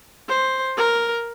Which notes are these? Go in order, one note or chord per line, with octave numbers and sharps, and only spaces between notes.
C5
A#4